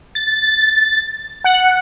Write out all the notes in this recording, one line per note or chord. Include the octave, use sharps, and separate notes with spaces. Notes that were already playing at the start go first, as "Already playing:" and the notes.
A6
F#5